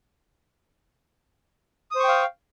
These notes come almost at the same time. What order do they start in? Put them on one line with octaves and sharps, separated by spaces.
D#6 C5 C#6 G5 F5